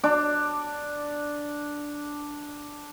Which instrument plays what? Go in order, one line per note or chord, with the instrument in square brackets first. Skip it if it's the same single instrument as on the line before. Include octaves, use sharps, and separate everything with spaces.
[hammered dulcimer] D4 D6